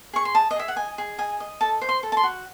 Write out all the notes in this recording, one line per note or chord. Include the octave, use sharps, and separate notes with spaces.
G#4 C#6
C6
D#5 A5
D#5
G#4 E5
F#5
D#5 G#5
G#4
D#5 G#5
D#5
A4 A5
C5
C6
A4
A5
C6
F#4